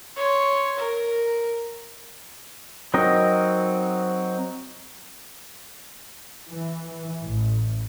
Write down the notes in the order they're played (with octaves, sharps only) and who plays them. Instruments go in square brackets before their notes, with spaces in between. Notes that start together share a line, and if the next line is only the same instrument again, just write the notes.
[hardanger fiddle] C#5 C6
A#4
[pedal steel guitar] F#3 C4 D#4 A#4 D#5
[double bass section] E3
A1